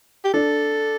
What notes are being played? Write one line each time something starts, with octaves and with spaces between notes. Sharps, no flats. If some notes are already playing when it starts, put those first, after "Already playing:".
G4
D4 A4